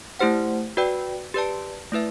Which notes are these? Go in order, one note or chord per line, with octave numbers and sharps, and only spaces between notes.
A3 E4 G4 C5 F#5
F#4 B4 D5 G5
G4 B4 D5 A5
A3 E4 B4 E5